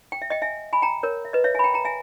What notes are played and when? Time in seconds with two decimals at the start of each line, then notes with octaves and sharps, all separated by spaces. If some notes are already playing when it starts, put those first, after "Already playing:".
0.12 G5
0.22 E5
0.30 D#5 G5
0.42 E5 G#5
0.73 G#5 B5
0.82 G5 A#5
1.03 A#4 C#5
1.25 E5
1.33 B4 D#5
1.44 C#5 E5
1.54 E5 G#5 B5
1.64 G5 A#5
1.74 G5 A#5
1.85 E5 G#5